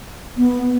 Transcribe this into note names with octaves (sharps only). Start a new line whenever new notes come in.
B3